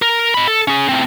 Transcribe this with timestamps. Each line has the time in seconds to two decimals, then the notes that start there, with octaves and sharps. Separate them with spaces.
0.02 A#4
0.34 D#5 B5
0.48 A4
0.68 C#4 G#4
0.89 A2 C4